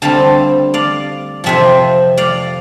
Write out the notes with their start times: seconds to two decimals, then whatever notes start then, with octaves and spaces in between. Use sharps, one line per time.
0.02 D3 G3 C4 F5 A5
0.74 D5 F5
1.44 F2 C3 F3 C4 C5 E5
2.17 D5 F5